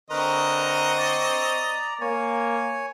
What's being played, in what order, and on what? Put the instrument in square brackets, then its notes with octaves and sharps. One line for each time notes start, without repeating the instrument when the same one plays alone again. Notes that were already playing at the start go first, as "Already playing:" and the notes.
[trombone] D3 [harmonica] C4 D#5 C#6 [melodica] A#4 B4 A#5
[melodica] D5 A#5
[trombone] A#3 [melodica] C#5 G#5